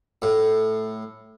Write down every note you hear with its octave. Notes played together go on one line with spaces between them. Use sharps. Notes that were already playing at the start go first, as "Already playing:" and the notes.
A2